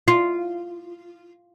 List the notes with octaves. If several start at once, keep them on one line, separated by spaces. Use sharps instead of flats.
F4